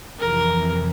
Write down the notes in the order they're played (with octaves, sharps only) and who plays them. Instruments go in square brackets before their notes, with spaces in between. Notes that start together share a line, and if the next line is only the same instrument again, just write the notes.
[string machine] F2 C3 E3 [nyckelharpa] A#4